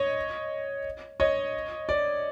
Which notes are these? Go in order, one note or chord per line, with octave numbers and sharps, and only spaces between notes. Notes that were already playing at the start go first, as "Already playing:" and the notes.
Already playing: C#5 D#5
C#5 D#5
D5